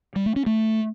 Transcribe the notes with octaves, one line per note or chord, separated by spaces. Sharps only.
G3
A3
C#4
A3